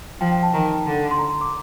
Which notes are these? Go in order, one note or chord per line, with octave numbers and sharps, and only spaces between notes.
F3 G5
G5
A5
D#3 A#5
D3
C6
A#5
C6
D6